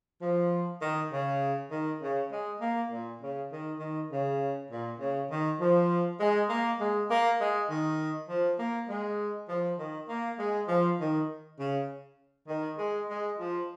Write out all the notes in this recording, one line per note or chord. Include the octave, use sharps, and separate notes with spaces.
F3
D#3
C#3
D#3
C#3
G#3
A#3
A#2
C#3
D#3
D#3
C#3
A#2
C#3
D#3
F3
G#3
A#3
G#3
A#3
G#3
D#3
F3
A#3
G#3
F3
D#3
A#3
G#3
F3
D#3
C#3
D#3
G#3
G#3
F3